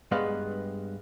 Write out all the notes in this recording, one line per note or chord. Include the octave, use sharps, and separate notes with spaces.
G2 G#3 B3 B4 F5